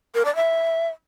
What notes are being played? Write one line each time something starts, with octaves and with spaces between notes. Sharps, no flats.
A#4
D5
E5